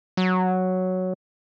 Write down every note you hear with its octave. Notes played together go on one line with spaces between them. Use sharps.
F#3